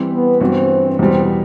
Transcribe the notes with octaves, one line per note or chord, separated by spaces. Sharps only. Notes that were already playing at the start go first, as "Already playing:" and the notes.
Already playing: E3 G3 C4 G4
B3
G2 E3 B3 C4 F#4
E2 B2 G3 C4